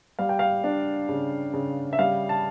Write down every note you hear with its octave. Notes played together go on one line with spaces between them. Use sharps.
G3 F5
G5
F5
D4
C#3
C#3
E5
G3 F5
A5